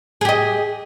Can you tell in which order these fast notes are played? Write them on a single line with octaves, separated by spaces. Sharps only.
G#4 G4 D#5